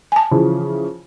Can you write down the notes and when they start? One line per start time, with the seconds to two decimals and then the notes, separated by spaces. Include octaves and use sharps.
0.12 G#5 A5
0.31 C#3 E3 F3